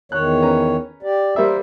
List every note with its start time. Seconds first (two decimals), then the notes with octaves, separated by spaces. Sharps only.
0.12 E2 D#3 C#5 F#6
0.42 C#4 B4 A#5
1.03 G4 D5
1.36 G3 A#3 A#4 C5 E5